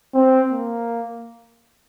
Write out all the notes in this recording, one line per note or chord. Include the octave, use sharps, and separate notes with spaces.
C4
A#3